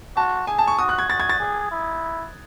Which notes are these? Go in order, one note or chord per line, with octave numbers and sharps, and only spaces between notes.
F#4 A5
G#4 G#5
A5
C#6
F#4 D#6
F#6
G#6
F#4 A6
G#6
A6
G#4
E4